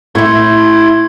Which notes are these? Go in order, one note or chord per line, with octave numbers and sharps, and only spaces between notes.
A2 E4 C#5 C6 G#6